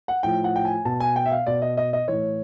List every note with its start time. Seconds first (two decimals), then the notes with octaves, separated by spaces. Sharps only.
0.08 F#5
0.23 A2 F3 G5
0.44 F#5
0.56 G5
0.65 G#5
0.85 B2 A5
1.00 G#5
1.16 G5
1.26 E5
1.32 F5
1.47 B2 D5
1.62 D#5
1.77 D#5
1.93 D#5
2.08 A2 E3 C#5